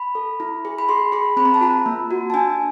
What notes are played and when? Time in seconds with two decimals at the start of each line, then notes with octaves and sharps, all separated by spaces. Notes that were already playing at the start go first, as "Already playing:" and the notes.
Already playing: B5
0.15 A4
0.40 E4
0.65 G#4
0.78 B5
0.89 G#4 C6
1.12 G#4 B5
1.37 C4 B5
1.45 A#5
1.54 A5
1.61 F4 A#5
1.86 A#3
2.11 F#4
2.30 A5
2.34 D4 G#5